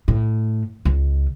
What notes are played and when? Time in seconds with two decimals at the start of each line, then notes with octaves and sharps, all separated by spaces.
0.08 A2
0.85 C#2